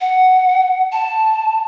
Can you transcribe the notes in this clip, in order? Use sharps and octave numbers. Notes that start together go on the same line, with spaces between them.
F#5
A5